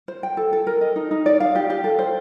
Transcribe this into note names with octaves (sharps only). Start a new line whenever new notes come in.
C5
G5
A4
A4
A#4
D#5
D#4
D#4
D5
F5
G4
G4
A4
C5